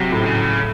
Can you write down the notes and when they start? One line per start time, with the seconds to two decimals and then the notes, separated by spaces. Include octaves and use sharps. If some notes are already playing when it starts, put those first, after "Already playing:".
Already playing: C3 F#3
0.12 A2
0.25 C#3